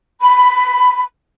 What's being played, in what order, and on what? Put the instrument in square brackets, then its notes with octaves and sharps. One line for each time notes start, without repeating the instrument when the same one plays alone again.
[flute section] B5